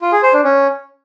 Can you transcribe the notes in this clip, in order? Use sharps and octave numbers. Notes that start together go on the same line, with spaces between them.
F4
G#4
C5
D4
C#4